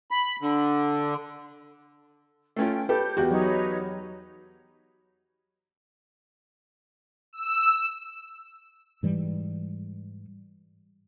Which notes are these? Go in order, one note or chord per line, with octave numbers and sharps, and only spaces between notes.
B5
D3
A3 C#4 F4 G5
G4 A4 B4 G6
E2 F#4 G4
F#3 D#4 B4 C#5
E6
G#2 E3 G3